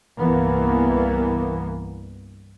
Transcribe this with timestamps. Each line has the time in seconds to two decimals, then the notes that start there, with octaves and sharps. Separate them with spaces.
0.20 C2 G2 E3 A#3 B3